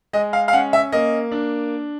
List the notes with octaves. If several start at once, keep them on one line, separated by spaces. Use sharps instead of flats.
G#3 D#5
F5
F5
C#4 F#5
E5
A#3 D#5
D4